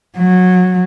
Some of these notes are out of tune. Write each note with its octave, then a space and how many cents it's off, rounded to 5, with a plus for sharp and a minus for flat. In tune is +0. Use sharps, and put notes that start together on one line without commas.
F#3 -20